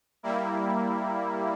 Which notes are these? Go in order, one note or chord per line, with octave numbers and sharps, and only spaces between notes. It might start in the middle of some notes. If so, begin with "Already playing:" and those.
G3 A#3 E4